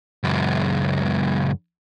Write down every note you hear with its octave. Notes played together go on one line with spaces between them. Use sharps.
C#2 F#2